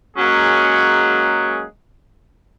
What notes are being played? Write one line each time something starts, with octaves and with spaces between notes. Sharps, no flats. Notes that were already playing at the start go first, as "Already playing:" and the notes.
F#3 G#3 A#3 C#4 G#4 F#5